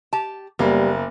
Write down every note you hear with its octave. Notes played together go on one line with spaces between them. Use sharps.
G4 A5
F#1 G3 A#3 B3